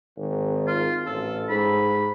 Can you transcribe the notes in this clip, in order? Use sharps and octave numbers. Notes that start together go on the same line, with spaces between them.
G#1
F4
A1 A4
G#2 B5